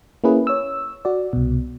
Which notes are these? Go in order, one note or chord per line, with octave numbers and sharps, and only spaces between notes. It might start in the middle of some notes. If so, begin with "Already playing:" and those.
A#3 C#4 E4 G#4 B4
C#5 E6
F#4 D5
C2 B2